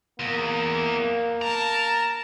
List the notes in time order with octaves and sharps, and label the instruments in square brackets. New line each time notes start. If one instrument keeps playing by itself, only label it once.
[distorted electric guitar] E2 [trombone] A#3
[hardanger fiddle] A#4 A5 [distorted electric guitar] A#5